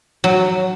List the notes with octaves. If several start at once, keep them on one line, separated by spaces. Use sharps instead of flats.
F#3